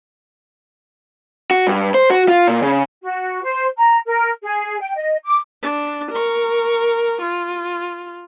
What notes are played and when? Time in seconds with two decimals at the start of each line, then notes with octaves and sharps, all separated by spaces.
1.51 F#4
1.67 G2
1.94 C5
2.10 F#4
2.28 F4
2.48 A#2
2.62 C#3
3.02 F#4
3.42 C5
3.77 A#5
4.05 A#4
4.42 G#4
4.80 G5
4.95 D#5
5.24 D6
5.62 D4
6.11 A#4 C#6
7.21 F4